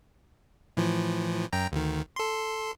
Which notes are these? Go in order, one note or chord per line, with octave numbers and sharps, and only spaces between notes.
A2 E3 F3
F#2 G5 A#5
D2 D#3
A4 C6